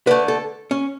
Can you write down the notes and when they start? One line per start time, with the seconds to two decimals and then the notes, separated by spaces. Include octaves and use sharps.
0.07 D3 A3 B4
0.28 A4
0.71 C#4